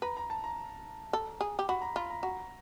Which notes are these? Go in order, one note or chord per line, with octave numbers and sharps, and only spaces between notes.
B4 A#5
A#5
A5
A#5
A4
G#4
G4
F#4 B5
A#5
F4 B5
A#5
F#4 A#5